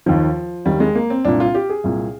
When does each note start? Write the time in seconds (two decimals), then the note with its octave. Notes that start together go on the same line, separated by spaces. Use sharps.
0.06 D#2 D#3 F3
0.65 D#2 D#3 G3
0.80 G#3
0.95 A#3
1.10 C4
1.25 C2 A#2 D4
1.40 F4
1.55 G4
1.70 G#4
1.84 C2 A#2